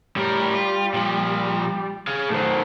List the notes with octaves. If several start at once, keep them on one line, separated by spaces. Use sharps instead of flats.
A2 G3 A#4
F4
A#2 F3
G#4 F5
B1 D#3 A3 C5